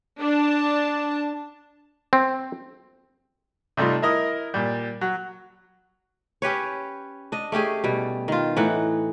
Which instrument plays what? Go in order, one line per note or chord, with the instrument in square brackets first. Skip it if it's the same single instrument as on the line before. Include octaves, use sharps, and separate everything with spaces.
[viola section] D4 A5
[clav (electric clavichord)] C4
[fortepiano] C3 G3 A3 D#4 F4
E4 A#4 D#5
A#2 G3
F#3
[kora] C#4 G4 B4 C#5
D4 D#5
A3 C#4 G4 G#4
B2 G3
D#3 F4
A2 E3 D#4 F#5